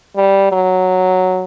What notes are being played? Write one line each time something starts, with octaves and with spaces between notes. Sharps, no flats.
G3
F#3